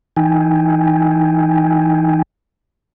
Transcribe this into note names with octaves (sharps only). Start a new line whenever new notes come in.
E3 D#4 G5 G#5